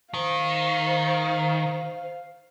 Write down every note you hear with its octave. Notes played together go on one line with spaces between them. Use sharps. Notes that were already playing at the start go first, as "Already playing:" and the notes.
D#3 C5 F5